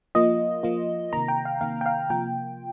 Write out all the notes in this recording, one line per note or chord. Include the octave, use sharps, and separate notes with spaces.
F3 A#3 F4 D#5
F3 A#3 F4
C3 D#3 A#3 A#5
G5
F5
C3 D#3 A#3 F5
G5
F5
C3 F3 A#3 F4 G5